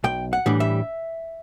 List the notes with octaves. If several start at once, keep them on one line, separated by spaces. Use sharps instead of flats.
B1 G5
F#5
A2 E3 G3 D4
E5